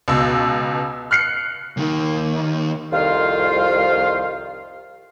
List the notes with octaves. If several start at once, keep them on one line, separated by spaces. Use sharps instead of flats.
C#2 B2 E6
F6 F#6 C7 C#7
D#2 D#3
C2 F2 D#3 F4 C5 F5